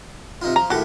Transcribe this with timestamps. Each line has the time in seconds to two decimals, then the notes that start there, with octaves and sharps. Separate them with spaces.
0.42 C3 D#4 F4
0.56 F3 A#5
0.70 A#1 A2 F#4 G4 A4